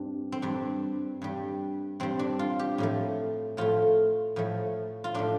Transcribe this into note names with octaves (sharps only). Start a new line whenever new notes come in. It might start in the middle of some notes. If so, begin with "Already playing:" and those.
Already playing: G2 G3 C4 D4
C4
G2 G3 D4
G2 G3
G2 G3 C4
D4
F4
G4
A2 F3 A3
A2 F3 A3 F4
A2 F3 A3
F4
A2 F3 A3 D4